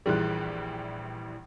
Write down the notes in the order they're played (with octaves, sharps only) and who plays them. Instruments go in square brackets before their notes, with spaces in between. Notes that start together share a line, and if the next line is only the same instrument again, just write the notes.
[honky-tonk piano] A#1 E3 G3 [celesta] G#4 C6 F#6